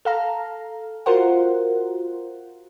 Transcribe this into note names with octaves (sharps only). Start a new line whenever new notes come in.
A4 F5 A#5
F4 F#4 A#4 C5 F#5